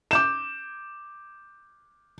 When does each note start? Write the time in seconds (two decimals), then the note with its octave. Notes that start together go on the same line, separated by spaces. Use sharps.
0.11 D6 G6 E7